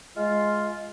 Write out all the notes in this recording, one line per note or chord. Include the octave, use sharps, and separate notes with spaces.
G#3 F4